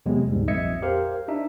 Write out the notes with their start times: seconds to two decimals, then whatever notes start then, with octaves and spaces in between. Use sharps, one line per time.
0.06 E2 C3 F#3 G#3 B3
0.30 D2 G#2 G3
0.47 A#1 F2 D#5 E5 G#6 C#7
0.82 G4 A#4 C5 F5
1.28 D4 D#4 E5